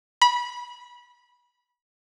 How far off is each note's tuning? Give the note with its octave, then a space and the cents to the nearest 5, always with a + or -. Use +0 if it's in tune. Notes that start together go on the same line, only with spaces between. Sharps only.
B5 -25